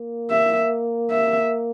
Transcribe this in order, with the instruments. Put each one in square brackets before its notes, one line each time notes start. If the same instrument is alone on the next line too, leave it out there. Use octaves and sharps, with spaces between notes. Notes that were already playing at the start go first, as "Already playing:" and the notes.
Already playing: [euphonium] A#3
[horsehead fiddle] E5
E5